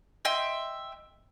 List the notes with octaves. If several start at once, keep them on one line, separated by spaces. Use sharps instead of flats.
D#5 E5 G5 C6